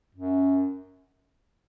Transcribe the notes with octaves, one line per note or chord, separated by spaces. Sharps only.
F#2